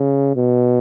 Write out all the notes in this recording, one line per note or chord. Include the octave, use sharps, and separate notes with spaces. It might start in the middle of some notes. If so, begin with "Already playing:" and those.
Already playing: C#3
B2